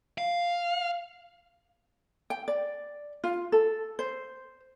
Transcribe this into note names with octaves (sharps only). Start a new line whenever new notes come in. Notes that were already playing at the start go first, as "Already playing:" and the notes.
F5
G5
D5
F4
A4
C5